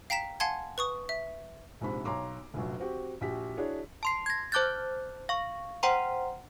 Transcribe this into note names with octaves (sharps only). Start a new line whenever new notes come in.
F5 G5 A#5 B6 E7
F5 F#5 G#5 A5 C6 G#6
B4 C#6 D#6
E5
A#1 G#2 C3 B5
B1 C#5 A#5 C6 D6
F1 A#1 F#3
C4 F#4 G4
A#1 F#4 G4 B6
D4 E4 F#4 G#4 C#5
A5 C6 C7
G#6 A#6
C5 A5 D6 F#6 G6 A6
F5 C#6
C5 F#5 G5 A#5 C6